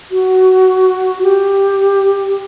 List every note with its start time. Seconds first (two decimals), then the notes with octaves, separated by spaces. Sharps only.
0.11 F#4
1.23 G4